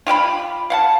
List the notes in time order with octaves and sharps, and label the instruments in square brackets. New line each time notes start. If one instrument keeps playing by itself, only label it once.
[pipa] F4 G4 F5 B5
F5 F#5 A5